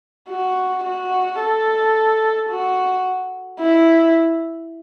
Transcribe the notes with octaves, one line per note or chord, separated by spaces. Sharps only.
F#4
F#4
A4
F#4
E4